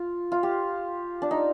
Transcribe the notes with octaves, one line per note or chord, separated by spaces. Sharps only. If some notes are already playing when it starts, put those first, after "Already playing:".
Already playing: F4
F4
G4
D4
D#4